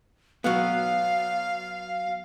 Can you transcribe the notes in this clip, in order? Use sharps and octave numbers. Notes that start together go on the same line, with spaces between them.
F#3 B3 F5